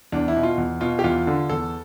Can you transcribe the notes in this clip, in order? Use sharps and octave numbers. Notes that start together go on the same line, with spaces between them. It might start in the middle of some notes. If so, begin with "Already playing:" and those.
E2 D4
E4
B2
F4
E2
B2 F4
G4
E2 F4
D3
E2 A4